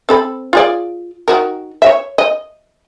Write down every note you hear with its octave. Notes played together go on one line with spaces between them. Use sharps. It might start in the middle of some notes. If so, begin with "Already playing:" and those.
C4 A4 B5
F4 G#4 D5
D#3 F#4 A#4
C#5 E5
D#5